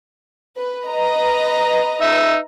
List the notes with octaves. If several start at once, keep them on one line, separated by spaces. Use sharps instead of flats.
B4
B4 D#5 A#5
D#4 E5